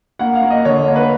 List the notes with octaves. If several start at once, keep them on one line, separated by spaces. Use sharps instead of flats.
A#3 F#5
F5
A#3
D#5
D3 C#5
A#3
B4